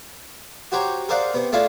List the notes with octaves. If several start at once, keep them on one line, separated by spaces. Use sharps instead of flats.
F#4 G4 C5 C#5 A#5
G#4 A#4 C5 D5 F5 F#5
C3 B3
A3 D4 E4 F4 G#4 F5